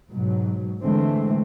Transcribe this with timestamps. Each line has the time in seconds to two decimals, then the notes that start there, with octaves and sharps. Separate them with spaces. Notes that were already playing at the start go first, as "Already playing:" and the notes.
0.11 G#2 B2 F#3
0.81 D3 E3 G#3 A3 C4